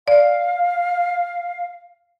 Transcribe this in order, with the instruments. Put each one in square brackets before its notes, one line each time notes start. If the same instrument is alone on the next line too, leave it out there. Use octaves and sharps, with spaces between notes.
[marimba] D5 [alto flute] F5